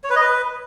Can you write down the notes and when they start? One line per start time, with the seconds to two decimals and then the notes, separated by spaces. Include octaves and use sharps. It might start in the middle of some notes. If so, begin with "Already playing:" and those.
0.04 C#5
0.10 B4
0.16 D#5
0.22 B4